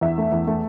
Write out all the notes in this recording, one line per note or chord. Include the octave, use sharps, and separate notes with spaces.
E2 E5
A3
E2
A3